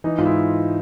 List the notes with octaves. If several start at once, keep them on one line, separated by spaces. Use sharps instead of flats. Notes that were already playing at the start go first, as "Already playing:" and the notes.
E3 D#4
G#2 F4
E4